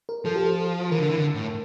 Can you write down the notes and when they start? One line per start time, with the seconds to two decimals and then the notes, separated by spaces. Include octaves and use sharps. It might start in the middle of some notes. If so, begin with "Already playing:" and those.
0.09 A#4
0.25 F3 A4
0.36 G4
0.46 A4
0.91 E3 A#4
0.99 D3
1.09 E3
1.17 D3
1.35 A2